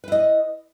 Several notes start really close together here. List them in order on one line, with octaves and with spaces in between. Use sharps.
B4 E4 D#5